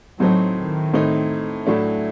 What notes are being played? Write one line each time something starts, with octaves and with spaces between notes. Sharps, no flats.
A2 F#3 A3 C4 D#4
D#3
A2 A3 C4 D#4
A2 F#3 A3 D4